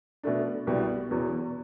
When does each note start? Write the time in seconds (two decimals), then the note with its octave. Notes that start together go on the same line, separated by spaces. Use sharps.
0.23 B2 A3 D4
0.67 C2 B2 G3
1.11 E2 B2 F#3